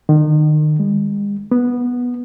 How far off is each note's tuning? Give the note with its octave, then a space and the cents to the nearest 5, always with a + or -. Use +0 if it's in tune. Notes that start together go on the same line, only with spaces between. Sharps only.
D#3 -35
G#3 -45
B3 -10